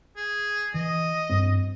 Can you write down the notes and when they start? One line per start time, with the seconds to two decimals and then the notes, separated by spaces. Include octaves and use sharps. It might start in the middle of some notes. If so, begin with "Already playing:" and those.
0.16 G#4
0.74 E3 D#5
1.30 G2 C4